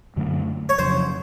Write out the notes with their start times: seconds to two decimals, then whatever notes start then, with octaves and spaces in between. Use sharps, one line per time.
0.16 F#2 D3 F#3 A3
0.69 C#5
0.78 F2 C#3 F#3 C5